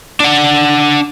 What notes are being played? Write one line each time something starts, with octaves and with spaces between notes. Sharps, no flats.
D4 F#5